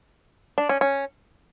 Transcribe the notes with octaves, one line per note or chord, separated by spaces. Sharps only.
D4
C#4
C#4